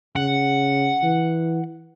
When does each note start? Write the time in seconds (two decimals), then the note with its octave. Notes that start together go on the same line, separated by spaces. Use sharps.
0.16 C#3 F#5
1.03 E3